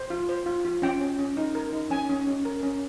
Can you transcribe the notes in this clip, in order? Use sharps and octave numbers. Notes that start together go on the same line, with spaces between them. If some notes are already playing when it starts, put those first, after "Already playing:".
Already playing: C5
F4
C5
F4
F4
C#4 G5
C#4
C#4
D#4
A#4
D#4
C#4 G#5
C#4
C#4
A#4
C#4